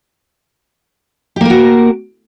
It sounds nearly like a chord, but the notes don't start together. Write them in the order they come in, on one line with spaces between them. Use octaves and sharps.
G4 A#3 A#4 F#4